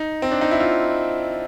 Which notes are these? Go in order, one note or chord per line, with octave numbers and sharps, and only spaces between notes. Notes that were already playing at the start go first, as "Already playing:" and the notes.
Already playing: D#4
C4
D4
D#4
E4
F4